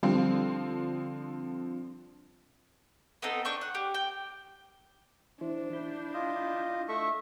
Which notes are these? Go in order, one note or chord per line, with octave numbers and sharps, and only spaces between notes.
D3 F3 G3 C4
B3 C4 D#4 A4
D4 C#6 G6
F#5
G4
G5
E3 D4 E4 C5
E4 B5 G6
F4 D#5
A3 A4 D#5 E5 C#6